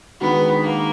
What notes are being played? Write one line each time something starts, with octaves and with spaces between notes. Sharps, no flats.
D#3 G#3 B3 D4 F#4
A#3